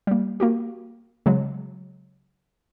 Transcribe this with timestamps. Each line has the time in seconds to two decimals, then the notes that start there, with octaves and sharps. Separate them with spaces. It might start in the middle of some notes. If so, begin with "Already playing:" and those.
0.07 G3 A#3
0.40 A#3 F#4 G4
1.26 C#3 F#3 G#3